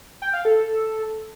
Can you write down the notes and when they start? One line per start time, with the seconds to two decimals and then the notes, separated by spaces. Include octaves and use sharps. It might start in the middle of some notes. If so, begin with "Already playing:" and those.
0.22 G5
0.33 F5
0.45 A4